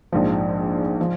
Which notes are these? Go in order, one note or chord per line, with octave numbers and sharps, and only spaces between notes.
A#1 G#2 F3
F3